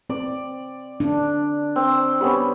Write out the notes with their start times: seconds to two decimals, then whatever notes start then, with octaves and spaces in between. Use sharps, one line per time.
0.10 C4 D5
1.00 D4
1.76 C4
2.21 G3 B3 C#4